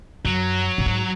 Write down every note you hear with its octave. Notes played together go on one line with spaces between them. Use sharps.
F#2 F#3
A2
G#2